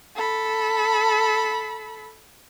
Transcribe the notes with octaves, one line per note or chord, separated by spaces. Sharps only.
A4 B5